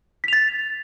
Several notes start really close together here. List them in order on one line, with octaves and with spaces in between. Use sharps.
B6 F7 A6